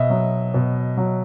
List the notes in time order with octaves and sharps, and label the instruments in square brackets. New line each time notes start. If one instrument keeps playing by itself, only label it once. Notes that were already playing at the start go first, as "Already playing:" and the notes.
Already playing: [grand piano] B2 D#5 E5
F#3
B2
F#3